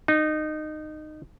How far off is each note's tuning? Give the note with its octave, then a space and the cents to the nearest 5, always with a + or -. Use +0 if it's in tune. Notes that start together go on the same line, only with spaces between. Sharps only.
D#4 -20